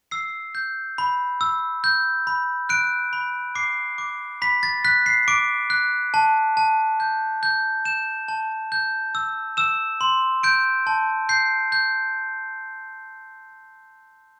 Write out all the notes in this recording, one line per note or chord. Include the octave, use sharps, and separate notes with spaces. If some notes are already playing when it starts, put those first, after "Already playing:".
E6 C7
G6
B5
E6
G6
B5
F#6 D7
B5
D6 C7
D6
B5 B6
A6
F#6 B6
C7
D6 D7
F#6
A5
A5
G6
G6
G6 E7
A5
G6
E6
E6 E7
C6
G6 D7
A5
G6 C7
G6